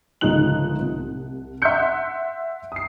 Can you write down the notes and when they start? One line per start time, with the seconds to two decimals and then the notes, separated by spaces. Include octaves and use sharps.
0.21 G1 C#2 F3 D#4 F#6 F#7
0.80 C2
1.62 E5 F#5 C6 F#6 G6 C#7
2.72 D#6 C7